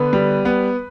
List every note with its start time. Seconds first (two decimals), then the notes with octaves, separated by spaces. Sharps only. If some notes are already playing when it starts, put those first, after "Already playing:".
Already playing: D3 B3 B4
0.13 G3
0.45 B3